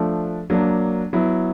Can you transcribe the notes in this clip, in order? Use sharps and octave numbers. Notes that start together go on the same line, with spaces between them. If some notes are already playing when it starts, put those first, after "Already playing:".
Already playing: F3 A3 D4
F#3 A#3 D4
F#3 B3 E4